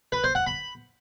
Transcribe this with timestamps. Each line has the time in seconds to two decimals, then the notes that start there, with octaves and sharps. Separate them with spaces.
0.12 B4
0.24 C5
0.35 F#5
0.47 B5